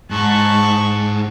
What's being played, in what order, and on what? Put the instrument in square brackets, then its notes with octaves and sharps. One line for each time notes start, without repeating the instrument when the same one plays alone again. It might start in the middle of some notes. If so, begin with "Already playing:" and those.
[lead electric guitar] G#2 [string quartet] A5 C#6 F#6